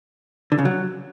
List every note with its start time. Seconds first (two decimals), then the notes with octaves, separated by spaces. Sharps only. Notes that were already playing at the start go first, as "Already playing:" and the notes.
0.52 D3
0.58 C#3
0.65 F#3